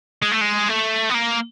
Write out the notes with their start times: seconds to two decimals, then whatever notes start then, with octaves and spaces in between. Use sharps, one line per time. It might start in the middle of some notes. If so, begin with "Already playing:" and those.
0.22 G#3
0.32 A3
0.41 G#3
0.68 A3
1.10 B3
1.14 A#3